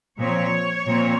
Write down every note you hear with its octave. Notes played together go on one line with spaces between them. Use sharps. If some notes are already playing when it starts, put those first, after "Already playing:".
A#2 F3 C4 C#5
A#2 F3 C4